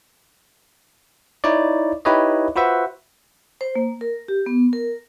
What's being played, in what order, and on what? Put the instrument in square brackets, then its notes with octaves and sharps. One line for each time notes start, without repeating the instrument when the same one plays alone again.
[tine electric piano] D#4 E4 C#5 D5
D#4 E4 G4 B4 C#5 D#5
F4 F#4 B4 C5 E5 F#5
[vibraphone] C5
A#3
A#4
G4
B3
A#4